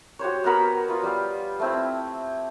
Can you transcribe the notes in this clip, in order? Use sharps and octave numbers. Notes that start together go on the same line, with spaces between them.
F#4 G4 C5 C#5
B3 F#4 A#4 B5
B3 F4
G3 G4 F5
A3 C4 E4